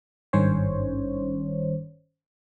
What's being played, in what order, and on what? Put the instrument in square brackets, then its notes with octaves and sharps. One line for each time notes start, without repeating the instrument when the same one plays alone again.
[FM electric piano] G#1 G2 D#3 C#4 C5 C#5